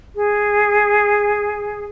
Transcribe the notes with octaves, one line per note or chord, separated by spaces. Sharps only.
G#4